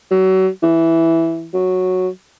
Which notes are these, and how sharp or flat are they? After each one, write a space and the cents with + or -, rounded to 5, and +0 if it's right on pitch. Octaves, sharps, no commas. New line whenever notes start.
F#3 +30
E3 +0
F#3 -5